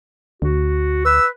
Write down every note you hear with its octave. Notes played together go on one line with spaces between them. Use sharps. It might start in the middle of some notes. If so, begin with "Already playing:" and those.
D2 F#4
B4 E6